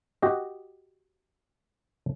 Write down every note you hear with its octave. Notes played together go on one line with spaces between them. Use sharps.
F#4 G4 D#5